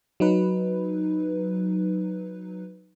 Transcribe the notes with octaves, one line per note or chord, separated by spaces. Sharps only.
F#3 D#4 B4